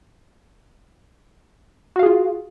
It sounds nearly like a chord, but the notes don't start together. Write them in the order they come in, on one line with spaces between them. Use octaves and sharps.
F#4 F5 G#4 F4